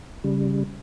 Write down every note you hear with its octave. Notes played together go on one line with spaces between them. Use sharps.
C#3 G3